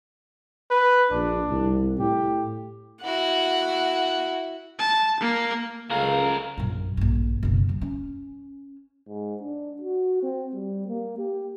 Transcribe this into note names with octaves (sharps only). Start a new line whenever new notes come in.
B4
A#1 D4
C2
A2 G4
E4 F#4 F#5
A5
A#3
C#2 C#3 A4 A#4 F5
A#1 F#2
A#1 G2
F#1 B2
F#3
C#4
G#2
D4
F#4
C4
G3
A#3
G4